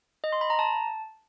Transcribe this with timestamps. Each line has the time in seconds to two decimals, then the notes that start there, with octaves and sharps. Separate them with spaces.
0.24 D#5
0.32 C6
0.41 B5
0.50 A#5
0.59 A5